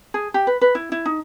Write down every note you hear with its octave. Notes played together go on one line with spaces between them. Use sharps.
G#4
G4
B4
B4
E4
E4
D#4